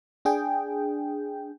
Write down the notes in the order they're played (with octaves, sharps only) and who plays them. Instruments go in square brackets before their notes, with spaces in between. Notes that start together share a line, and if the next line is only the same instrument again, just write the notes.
[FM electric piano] D4 G#4 G5